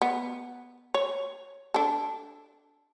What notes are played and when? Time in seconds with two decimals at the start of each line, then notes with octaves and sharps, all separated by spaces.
0.02 B3
0.94 C#5
1.74 D4 A4